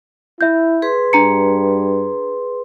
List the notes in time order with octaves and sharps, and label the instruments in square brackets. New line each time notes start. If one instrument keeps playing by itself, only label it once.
[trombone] E4 [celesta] E5 G6
[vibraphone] G#4 B4 C6
[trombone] G2 [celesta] D4 A#5 C#7